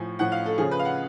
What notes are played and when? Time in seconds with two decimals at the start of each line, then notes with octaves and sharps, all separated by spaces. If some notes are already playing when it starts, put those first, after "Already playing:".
Already playing: A2 F3 G#5
0.19 A2 F3 F#5
0.32 F5
0.46 A4
0.58 C#3 F3 G#4
0.71 B4
0.79 F5
0.85 F#5